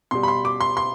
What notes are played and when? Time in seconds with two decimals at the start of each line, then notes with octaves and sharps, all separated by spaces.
0.11 B2 G3 C6
0.23 B5
0.28 C6
0.45 D6
0.61 C6
0.77 C6